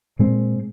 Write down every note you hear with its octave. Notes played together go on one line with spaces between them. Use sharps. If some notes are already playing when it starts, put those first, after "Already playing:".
A#2 G#3 C4